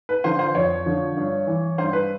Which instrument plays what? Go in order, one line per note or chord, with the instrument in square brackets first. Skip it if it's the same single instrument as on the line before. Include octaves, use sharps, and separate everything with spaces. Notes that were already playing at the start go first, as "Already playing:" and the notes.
[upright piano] B4
D3 F3 C5
C5
F2 C#5
D3 F3
G2
E3
G2 C5
B4